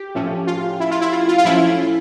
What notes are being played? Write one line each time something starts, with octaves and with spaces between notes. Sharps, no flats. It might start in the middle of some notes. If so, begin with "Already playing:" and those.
Already playing: G4
A2 F3 A3 C#4
F4
E4
F4
E4
F4
F4
F4
A2 F3 A3 C#4 E4